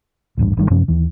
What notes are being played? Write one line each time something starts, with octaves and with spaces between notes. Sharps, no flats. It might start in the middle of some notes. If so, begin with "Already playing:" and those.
D#1 A1 G2
G1 D#3 G3
F#2 C3 F3 C#4
D#2 E3